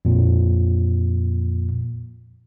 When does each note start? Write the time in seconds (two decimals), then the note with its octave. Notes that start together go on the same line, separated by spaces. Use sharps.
0.05 F2 A#2